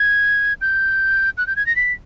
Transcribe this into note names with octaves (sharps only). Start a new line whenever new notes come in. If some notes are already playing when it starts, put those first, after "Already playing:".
Already playing: G#6
G6
F#6
G6
G#6
A#6
B6